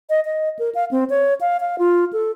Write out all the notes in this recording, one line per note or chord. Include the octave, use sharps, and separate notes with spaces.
D#5
D#5
A#4
F5
C4
C#5
F5
F5
F4
A4